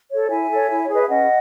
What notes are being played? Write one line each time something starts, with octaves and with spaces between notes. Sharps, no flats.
A4 C#5
E4 E5 G#5
A4 C#5
E4
C#5
G#4 B4 D#5
E5
C#4 D#5 F#5